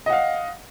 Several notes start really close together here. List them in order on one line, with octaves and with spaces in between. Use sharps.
D#5 F#5 F5